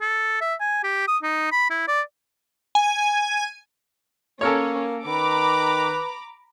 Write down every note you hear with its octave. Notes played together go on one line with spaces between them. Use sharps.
A4
E5
G#5
G4
D#6
D#4
B5
E4
D5
G#5
A#3 C#4 A4 A#4 C#5
D#3 B4 A#5 B5 D6